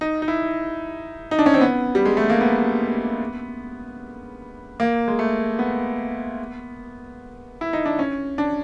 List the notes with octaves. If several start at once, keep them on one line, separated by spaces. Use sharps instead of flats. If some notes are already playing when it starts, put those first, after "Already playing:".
D#4
D#4
E4
D#4
D4
C#4
C4
B3
G3
G#3
A3
A#3
B3
A#3
G#3
A3
B3
E4
D#4
D4
C#4
D4